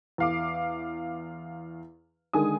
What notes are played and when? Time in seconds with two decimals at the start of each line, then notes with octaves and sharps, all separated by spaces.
0.18 E2 F5 D6
2.33 D3 D#3 G#3 G#5 D#6